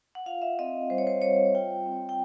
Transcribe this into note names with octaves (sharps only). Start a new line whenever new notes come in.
F#5
F4 F5
E5
C4 D#5
G3 C5
C#5
C5
G3 C#5
F4 G5
C4
G5